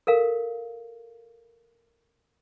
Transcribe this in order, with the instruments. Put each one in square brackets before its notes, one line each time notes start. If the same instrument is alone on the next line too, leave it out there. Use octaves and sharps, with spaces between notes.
[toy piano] A4 A#4 F5